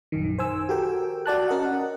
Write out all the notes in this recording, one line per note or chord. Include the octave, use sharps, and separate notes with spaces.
A#1 F#2 D#3
C5 G#5 E6
F#4 G4 A4 A#4 G5
F#4 D5 A5 F#6
C#4 A#4 D#5 F#5